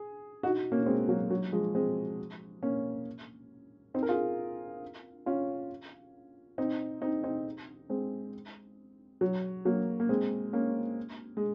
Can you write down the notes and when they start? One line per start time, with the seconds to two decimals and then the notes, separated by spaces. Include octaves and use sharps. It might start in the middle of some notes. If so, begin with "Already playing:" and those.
Already playing: G#4
0.43 D#4 F#4
0.72 A#3 C#4
0.86 G#3 C4
1.08 F#3 A#3
1.30 F#3
1.52 F3 G#3
1.75 G#3 C4
2.63 A#3 C#4
3.94 C4 D#4
4.03 A#4
4.09 F4 G#4
5.26 C#4 F4
6.58 C4 D#4
7.02 C4 D#4
7.24 C4 D#4
7.89 G#3 C4
9.21 F#3
9.65 F#3 A#3
10.00 A#3
10.09 G#3 C4
10.53 A#3 C#4
11.37 G#3